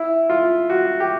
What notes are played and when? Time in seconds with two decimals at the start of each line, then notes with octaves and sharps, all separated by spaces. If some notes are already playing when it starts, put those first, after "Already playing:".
Already playing: E4
0.30 F4
0.70 F#4
1.00 G4